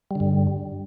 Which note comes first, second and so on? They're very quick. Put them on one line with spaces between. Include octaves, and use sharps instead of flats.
G3 D3 G2